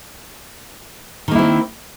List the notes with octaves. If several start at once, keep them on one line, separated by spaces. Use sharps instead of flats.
D#3 A#3 C4 E4